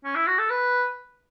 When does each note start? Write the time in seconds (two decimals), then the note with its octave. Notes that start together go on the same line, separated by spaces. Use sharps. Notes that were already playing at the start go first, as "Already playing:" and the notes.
0.04 C#4
0.15 E4
0.27 F#4
0.38 A4
0.50 B4